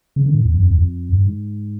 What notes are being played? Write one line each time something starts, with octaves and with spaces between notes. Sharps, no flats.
C#3
D3
A2
E2
F#2
F2
E2
F2
G2
G#2